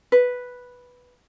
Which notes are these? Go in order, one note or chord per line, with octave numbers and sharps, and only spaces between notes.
B4